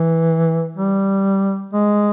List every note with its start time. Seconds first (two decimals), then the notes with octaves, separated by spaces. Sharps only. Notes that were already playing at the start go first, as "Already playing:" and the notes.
Already playing: E3
0.77 G3
1.73 G#3